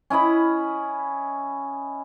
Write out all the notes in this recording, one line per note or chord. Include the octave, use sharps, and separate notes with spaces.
C#4 E4 D#5 B5